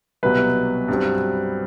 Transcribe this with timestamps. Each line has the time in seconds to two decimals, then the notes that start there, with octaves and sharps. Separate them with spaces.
0.23 C2 B2 F#3 B4
0.88 G2 F#3 C4